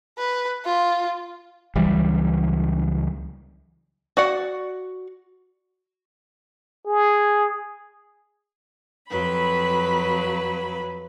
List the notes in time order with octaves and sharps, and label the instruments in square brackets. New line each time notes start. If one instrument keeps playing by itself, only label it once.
[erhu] B4
F4
[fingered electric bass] C#2 E3 F#3 G3
[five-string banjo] F#4 D5 F#5
[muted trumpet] G#4
[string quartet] F2 F#3 B4 B5